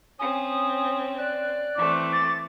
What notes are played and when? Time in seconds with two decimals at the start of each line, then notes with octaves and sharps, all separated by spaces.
0.19 C4 C#4 G#5 D#6
1.18 D5 F#6
1.76 E3 A3 C4 D6
2.13 A6